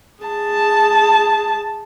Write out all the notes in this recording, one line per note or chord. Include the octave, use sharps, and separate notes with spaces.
G#4 A5